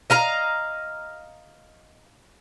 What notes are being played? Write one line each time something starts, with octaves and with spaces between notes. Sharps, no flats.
D#5 F5 A#5